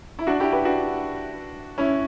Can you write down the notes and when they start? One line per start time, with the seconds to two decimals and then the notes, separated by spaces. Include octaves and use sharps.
0.19 E4
0.27 D4 F#4
0.40 E4 G4
0.52 G4 B4
0.65 D4 F#4
1.78 C#4 E4